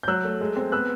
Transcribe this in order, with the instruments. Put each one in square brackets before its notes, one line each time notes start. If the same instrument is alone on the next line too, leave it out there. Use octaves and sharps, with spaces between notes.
[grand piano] G6
F#3 E6 F#6
A3
G#3
C4
B3 E6 F#6